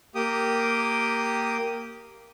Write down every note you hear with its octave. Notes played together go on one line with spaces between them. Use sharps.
A#3 G4 D#6